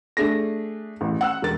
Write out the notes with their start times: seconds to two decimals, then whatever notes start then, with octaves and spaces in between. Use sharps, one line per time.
0.17 A3 D4 G#4 A#6
1.01 A1
1.21 F#5 E6 F#6
1.42 E1 A#4 A6